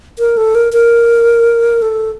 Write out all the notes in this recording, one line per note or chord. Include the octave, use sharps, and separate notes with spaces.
A#4
A4
A#4
A#4
A4